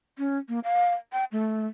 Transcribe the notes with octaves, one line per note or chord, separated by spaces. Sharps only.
C#4
A#3
F5
G5
A3